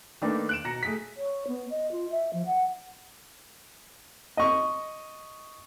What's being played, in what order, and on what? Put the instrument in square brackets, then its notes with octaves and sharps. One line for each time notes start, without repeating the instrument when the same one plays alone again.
[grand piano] D#3 A3 A#3 D4 D#4 B4
F#6 D7 E7
B2 A#5 A#6 C#7
A3 G#4 B6
[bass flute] C#5
B3
D#5
F4
E5
F3
F#5
[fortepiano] D#5 C#6